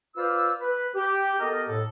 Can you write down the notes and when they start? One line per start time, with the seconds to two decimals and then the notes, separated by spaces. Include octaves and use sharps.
0.16 F4 B4 C5 D5 F5 E6
0.60 B4
0.94 G4
1.40 B3 G4 A4 A#4 D#5
1.68 A2 A4